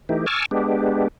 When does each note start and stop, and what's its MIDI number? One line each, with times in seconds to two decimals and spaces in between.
0.09 0.26 52
0.09 0.26 57
0.09 0.26 63
0.09 0.26 67
0.26 0.46 80
0.26 0.46 81
0.26 0.46 85
0.26 0.46 86
0.26 0.46 88
0.26 0.46 89
0.51 1.08 56
0.51 1.08 59
0.51 1.08 62
0.51 1.08 67